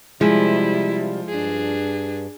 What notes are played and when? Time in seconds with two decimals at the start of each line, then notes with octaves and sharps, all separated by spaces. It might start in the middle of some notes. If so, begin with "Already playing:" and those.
0.21 C3 F3 G3 G#3 E4
1.29 G2 D4 G#4